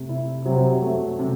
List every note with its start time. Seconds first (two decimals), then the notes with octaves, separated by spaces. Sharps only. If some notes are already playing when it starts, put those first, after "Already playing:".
Already playing: C3 A3
0.09 E4
0.45 C3 F#3
0.82 A3
1.19 C3